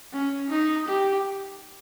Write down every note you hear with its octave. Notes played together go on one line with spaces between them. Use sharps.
C#4
D#4
G4